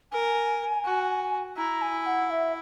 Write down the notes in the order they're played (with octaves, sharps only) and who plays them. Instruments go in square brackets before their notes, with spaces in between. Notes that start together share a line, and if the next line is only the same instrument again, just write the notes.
[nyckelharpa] A#4 [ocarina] G#5
[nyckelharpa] F#4
[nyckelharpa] E4 [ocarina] A#5
[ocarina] G#5
F#5
E5